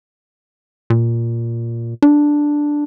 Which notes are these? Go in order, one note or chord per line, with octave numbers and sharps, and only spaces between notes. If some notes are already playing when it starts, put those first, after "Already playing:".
A#2
D4